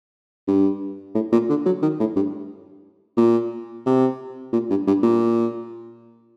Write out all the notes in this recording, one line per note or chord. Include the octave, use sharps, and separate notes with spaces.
G2
A2
A#2
D3
F#3
D#3
A2
G2
A#2
C3
A#2
G2
G2
A#2